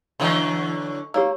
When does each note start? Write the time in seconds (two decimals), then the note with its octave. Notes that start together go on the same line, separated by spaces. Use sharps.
0.20 D3 E3 F#3 A3 C#4 D#4
1.14 A#3 G4 C#5 E6